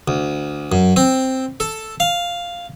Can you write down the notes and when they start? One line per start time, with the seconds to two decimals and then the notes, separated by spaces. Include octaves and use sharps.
0.08 D2
0.72 F#2
0.96 C4
1.60 A4
2.00 F5